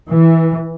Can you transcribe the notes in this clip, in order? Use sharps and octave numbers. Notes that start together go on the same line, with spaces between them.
E3